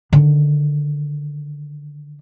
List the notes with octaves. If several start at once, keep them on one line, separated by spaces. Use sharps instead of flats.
D3 D#3